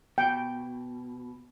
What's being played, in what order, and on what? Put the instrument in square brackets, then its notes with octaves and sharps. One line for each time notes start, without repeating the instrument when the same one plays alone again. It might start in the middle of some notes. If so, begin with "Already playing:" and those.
[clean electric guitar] B2 [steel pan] G5